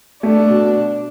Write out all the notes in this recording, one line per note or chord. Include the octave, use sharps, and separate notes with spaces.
A3 D4
B2